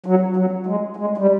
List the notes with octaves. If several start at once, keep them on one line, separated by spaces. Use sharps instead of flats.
F#3
F#3
G#3
G#3
G3